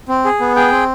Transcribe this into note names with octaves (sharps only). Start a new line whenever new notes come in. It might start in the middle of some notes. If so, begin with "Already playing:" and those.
C4
G#4
B3
G#4 G5
C4